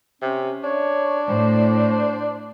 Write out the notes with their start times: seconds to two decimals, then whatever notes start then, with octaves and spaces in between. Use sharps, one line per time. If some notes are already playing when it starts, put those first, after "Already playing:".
0.22 C3 C#4
0.63 D4 C#5
1.28 A2 C5